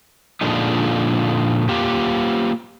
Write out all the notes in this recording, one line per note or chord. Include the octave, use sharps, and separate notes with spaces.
A#2 D3 F3 G#3 D4 D#4
A#3 F4 G4